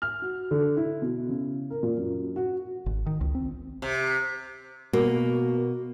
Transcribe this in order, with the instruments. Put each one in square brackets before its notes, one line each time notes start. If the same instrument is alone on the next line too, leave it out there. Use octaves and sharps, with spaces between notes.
[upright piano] F6
F#4
D3
E4
B2
C#3
A#4
A#2
F#2
F#4
[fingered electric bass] G#1
D#3
C#2
C4
[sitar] C3
[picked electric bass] B2 [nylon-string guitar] A#3 [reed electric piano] F#4